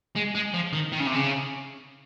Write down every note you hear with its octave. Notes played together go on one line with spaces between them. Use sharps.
G#3
G#3
F3
D#3
D#3
C#3
C3
C#3